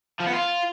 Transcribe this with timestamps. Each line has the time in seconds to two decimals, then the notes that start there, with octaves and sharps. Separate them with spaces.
0.20 F3
0.27 B3
0.34 F4